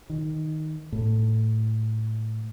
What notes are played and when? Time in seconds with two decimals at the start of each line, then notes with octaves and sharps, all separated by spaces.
0.10 D#3
0.92 A2